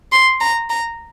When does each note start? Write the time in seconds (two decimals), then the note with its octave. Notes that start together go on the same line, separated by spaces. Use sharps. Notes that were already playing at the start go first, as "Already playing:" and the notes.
0.12 C6
0.41 A#5
0.70 A#5